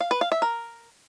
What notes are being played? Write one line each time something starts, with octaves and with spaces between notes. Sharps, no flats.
F5
B4
F5
E5
A#4